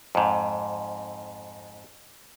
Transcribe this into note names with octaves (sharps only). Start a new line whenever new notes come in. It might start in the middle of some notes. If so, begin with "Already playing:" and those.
F2 G#2